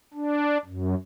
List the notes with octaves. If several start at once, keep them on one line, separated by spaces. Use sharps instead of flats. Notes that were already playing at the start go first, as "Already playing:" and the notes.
D4
F#2